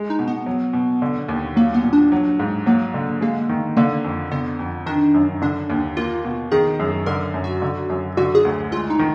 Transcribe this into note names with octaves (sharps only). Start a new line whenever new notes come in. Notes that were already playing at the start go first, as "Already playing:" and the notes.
Already playing: G#3
D#4
B2
B3
F#3
B2
D3
D#2
F#3 A#3
B3
A#2
D4
F#3
G#2
F#3 A#3
D3
G#3 A#3
D#3
D3 A#3
F2
D3 B3
F2
D#3 D4
F#2
D3 D4
D#2
A#3 F4
B2
D#3 G#4
F#2
D3 A#4
F#2
F#4
D3
F#2
D3 F#4
G#4
D2
G#3 F4
D#4
D#3